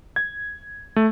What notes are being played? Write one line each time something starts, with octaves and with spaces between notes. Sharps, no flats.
G#6
A3